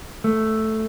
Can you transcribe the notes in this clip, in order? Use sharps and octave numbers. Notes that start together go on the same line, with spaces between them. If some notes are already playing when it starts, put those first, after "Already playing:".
A3